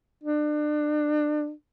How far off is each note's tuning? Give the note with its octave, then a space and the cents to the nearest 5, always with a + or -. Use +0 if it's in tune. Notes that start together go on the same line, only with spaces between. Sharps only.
D4 +30